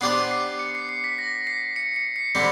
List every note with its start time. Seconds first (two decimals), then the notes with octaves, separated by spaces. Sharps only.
0.01 B3 D4 G4 C5 C7
0.31 C7
0.59 C#7
0.75 C7
0.89 C7
1.04 B6
1.19 A#6
1.47 C7
1.76 C#7
1.96 C#7
2.16 C7
2.35 D3 G3 C4 B6